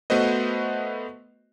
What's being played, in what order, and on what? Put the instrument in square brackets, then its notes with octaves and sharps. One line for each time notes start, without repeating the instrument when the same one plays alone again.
[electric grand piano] A3 B3 F#4 B4 C5 D#5